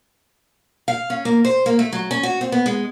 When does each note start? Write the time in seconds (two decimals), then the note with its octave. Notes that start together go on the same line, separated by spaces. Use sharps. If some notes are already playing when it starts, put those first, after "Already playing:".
0.88 F5
1.10 C#4
1.25 A#3
1.45 C5
1.66 A#3
1.79 A3
1.93 F#3
2.11 C#4
2.23 F#4
2.41 C4
2.52 B3
2.66 G#3